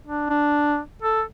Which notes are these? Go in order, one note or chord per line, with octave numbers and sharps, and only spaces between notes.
D4
D4
A4